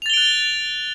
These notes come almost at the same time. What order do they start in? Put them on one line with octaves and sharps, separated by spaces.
F7 A6 G7 D7 F#6